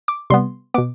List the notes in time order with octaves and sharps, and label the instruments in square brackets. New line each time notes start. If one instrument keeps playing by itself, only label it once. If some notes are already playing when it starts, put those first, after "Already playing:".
[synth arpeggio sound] D6
C3 G3 B3 C6
B2 B3 D6